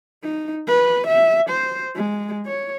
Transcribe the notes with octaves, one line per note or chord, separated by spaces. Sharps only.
D#4
B4
E5
C5
G#3
C#5